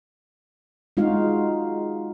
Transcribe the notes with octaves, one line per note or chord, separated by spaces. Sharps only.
G#3 D#4 F4 F#4 F5